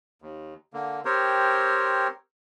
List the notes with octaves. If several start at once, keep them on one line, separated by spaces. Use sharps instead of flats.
D#2
D3 A#3
C4 G4 A#4 C5 C#5